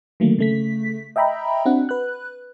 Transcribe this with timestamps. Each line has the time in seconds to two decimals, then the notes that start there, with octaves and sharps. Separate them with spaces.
0.20 D3 D#3 F#3 A3 A#3
0.39 C#3 A3 B6
1.16 D#5 E5 G5 A#5 B5
1.66 C4 D4 F#4 F#5
1.89 B4 F#6